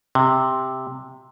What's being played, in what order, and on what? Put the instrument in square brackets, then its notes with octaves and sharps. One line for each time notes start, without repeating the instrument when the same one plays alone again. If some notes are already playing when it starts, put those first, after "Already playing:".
[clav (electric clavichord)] C3